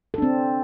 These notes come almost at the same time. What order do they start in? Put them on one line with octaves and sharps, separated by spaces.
A4 D4 C4